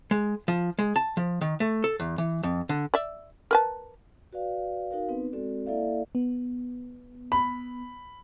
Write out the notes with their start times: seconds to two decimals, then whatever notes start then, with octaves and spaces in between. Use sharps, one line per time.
0.11 G#3
0.48 F3
0.79 G#3
0.96 A5
1.17 F3
1.41 D#3
1.60 A3
1.84 A4
2.00 E2
2.18 E3
2.43 F2
2.69 D3
2.94 D5 E5
3.51 A#4 B4 A5
4.33 F#4 B4 D5 F5
4.91 D#4 F#4 A#4 F5
5.09 B3 C4 D#4 B4
5.32 G#3 C4 F#4 A4 D5
5.66 A#3 E4 A4 D5 E5 F5
6.15 B3
7.32 B5